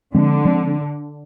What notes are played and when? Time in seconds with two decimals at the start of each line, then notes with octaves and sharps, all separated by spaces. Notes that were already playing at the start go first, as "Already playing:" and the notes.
0.15 D3 F3 G#3 C4
0.45 F3 G#3 C4